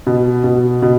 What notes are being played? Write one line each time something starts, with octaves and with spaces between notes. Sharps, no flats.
B2
B2
B2